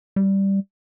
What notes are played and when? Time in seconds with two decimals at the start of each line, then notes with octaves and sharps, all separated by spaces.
0.16 G3